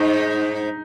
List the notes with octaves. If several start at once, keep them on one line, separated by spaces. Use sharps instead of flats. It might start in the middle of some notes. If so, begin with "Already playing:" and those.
Already playing: G#2 D#4